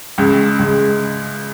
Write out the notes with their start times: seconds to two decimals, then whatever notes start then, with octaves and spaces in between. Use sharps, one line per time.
0.18 C#2 C#3 G#3
0.59 C#2 C#3 G#3